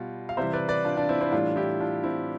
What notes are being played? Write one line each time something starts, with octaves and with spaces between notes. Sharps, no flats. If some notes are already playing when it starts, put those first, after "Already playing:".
Already playing: B2 G3 F4
F5
C3 E3 G3 C5 E5
B4 D5
B4 D5
D4 F4
D4 F4
C4 E4
C4 E4
A2 E3 G3 D4 F4
E4 G4
D4 F4
C4 E4